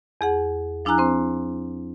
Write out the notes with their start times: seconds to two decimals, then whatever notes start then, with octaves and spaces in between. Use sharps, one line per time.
0.21 E2 G#4 F#5
0.85 F3 D4 E4 G#5 A#5 F#6
0.98 C4 C5